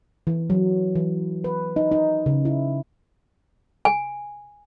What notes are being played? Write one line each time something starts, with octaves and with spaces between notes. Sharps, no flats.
E3
F#3
E3
B4
D#4
D#4
C#3
E4
G#5